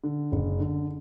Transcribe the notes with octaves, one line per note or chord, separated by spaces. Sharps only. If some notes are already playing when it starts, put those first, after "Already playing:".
D3
F#1
D3